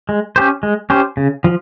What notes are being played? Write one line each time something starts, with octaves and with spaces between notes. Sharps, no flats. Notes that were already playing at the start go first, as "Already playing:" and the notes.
G#3
C#4 G4 C5
G#3
C#4 G4 C5
C#3
F3